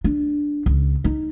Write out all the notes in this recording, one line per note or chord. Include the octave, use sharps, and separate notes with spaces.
D4
C#2
D#4